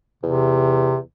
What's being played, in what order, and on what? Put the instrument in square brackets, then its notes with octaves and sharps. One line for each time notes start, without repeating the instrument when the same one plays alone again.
[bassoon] E2 [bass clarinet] C3